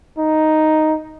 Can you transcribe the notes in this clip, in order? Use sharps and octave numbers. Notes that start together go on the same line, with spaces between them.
D#4